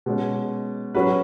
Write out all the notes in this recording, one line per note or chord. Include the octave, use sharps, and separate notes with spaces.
B2 G#3 C#4
F#3 C#4 F#4 B4